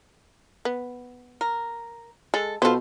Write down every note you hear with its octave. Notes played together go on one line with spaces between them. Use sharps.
B3
A#4
G#3 A4
B2 B3 F4 A4 C5